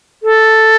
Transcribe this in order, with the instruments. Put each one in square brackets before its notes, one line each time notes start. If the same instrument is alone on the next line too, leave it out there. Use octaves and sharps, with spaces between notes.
[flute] A4